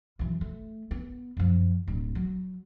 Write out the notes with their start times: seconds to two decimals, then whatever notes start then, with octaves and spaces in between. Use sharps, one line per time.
0.19 F#2 E3
0.41 A3
0.91 B3
1.37 F#2 F3
1.88 D1
2.15 F#3